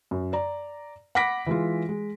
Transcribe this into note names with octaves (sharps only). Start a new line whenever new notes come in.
F#2
D5 A#5
F#5 B5 D6 A#6 B6 D7
E3 G#3 F4
G#3